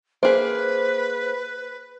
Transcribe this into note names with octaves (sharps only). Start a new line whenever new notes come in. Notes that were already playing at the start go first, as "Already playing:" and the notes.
A#3 G#4 B4 C5